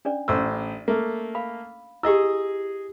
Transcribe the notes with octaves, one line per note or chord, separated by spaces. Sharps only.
C#4 D4 D5
A1 C5 E6
A3 A#3
F5 B5
E4 G4 G#4 D#5 E6